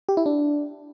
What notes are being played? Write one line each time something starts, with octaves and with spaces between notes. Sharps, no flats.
G4
E4
D4